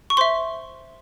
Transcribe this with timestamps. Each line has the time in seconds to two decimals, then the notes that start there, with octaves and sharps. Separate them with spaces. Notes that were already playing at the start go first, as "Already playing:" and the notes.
0.10 C#6
0.17 C5 E5 C6